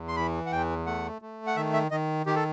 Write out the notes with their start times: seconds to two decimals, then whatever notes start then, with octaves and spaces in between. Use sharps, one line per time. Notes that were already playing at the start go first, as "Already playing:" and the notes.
Already playing: E2
0.08 C6
0.16 E3 B5
0.46 F#5
0.51 E2 G5
0.86 A3 F#5
1.22 A3
1.47 F#5
1.56 D#3 E5
1.73 E5
1.91 D#3 D#5
2.26 D#3 G4
2.35 A4